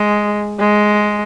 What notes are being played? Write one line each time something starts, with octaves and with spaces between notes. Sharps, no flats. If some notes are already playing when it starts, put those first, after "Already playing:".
Already playing: G#3
G#3